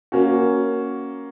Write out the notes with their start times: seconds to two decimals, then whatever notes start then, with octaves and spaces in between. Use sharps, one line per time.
0.12 A#3 C#4 F#4